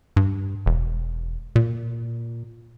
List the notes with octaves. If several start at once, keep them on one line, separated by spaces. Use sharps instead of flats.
G2
E1
A#2